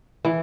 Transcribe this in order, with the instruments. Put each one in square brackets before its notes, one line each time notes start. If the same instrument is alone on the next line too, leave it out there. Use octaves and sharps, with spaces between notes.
[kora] E3